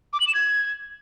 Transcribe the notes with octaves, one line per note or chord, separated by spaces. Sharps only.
D6
F#7
E7
G#6